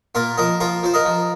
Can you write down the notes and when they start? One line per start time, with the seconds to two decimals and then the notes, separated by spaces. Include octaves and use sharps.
0.15 A#2 F4 A#4
0.38 F3 A#4 D#5
0.60 F3 F4 A#4
0.83 F3 C5
0.94 A#4 D#5
1.05 F3